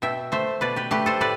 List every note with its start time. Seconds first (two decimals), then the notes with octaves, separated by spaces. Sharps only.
0.02 B2 E5 G5
0.32 A3 C5 E5
0.61 B2 B4 D5
0.76 G4 B4
0.91 A3 G4 B4
1.06 A4 C5
1.21 A2 B4 D5